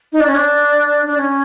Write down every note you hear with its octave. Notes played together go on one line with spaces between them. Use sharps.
D#4
D4
C#4
D4
D4
C#4